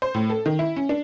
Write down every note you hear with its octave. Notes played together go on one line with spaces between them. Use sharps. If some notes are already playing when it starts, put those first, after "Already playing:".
C5
A2
A4
D#3
E4
C#4
D4